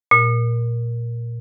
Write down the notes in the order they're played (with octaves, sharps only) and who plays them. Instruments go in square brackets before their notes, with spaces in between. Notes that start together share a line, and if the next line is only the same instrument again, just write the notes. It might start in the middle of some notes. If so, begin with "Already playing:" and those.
[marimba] A#2